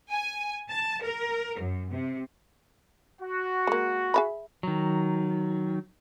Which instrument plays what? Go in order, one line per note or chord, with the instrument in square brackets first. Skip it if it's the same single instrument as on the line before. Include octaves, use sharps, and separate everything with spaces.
[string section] G#5
A5
A#4
F#2
C3
[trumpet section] F#4
[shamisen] G#3 A#3
G#4 E5 B5
[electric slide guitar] D#3 F#3